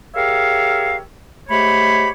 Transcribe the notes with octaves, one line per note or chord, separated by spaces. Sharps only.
G4 G#4 A#4 C#5 E5 F5
G#2 A3 G4 C#5 B5